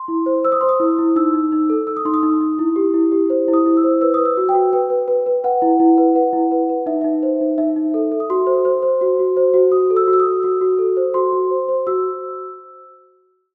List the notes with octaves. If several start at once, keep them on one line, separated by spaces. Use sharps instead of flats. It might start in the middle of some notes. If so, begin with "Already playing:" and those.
Already playing: C6
E4
C5
C5 E6
D#6
C5 C6
D#6
E4
E4
D#4 E6
D#4
D#4
A4
A4 E6
D#6
D#4 C6
D#6
D#4
D#4
E4
G4
E4
G4
C5
E4
D#6
E4
E6
C5
B4 E6
B4 D#6
E6
F#4
G5
F#4
B4 G5
B4
B4
B4
B4 F#5
E4
E4
B4
B4 F#5
E4
B4
B4
D#4 E5
D#4 E5
C5
D#4
D#4 E5
D#4
A4
A4
D#6
F#4 C6
C5
C5
C5
F#4
F#4
C5
F#4
F#4 D#6
A4
E6
F#4
E6
D#6
F#4
F#4 D#6
F#4
A4
C5
F#4 C6
F#4
C5
C5
F#4 E6